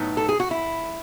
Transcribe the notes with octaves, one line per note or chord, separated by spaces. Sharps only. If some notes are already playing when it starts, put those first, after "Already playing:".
Already playing: A2 F#3 B3 D#4
A4
G#4
F#4
E4